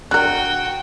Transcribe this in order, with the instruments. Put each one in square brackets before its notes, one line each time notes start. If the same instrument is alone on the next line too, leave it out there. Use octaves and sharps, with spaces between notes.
[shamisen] D4 A#4 [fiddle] F#4 G5 [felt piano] F#6